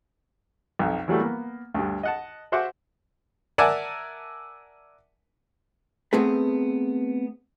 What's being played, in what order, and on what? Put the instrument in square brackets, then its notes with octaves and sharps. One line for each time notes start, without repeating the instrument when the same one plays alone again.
[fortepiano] B1 F2
E3 F#3 G3 A3
A#3 B3
D2 G2
D#5 F#5 A5
F#4 C5 E5 F#5 D6
A#4 D5 E5 F#5 G#5 A5
[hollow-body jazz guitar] A3 B3 C4 G#4 B4